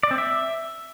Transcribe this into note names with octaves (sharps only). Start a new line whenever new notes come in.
D5
C4
E5